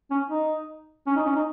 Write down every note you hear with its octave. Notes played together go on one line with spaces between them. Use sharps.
C#4
D#4
C#4
D#4
C#4
D#4